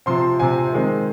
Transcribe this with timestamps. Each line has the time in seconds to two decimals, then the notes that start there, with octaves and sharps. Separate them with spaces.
0.06 C3 F3 C4 C6
0.39 C3 F3 C4 G#5
0.73 D#3 G#3 C4